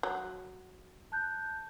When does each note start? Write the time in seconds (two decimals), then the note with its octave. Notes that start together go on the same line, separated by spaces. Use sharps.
0.03 F#3
1.12 A5 F#6 G6